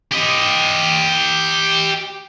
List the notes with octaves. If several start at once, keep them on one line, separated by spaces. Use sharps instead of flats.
G4 D#5